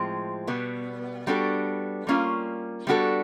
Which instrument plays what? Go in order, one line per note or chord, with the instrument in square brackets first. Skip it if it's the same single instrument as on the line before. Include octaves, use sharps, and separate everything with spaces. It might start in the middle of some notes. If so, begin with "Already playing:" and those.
Already playing: [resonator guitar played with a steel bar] A2 F3 G#3 C4
B2 G3 B3
G3 B3 D4 F#4 A4
G3 A#3 C#4 F4
G3 B3 D4 F#4 A4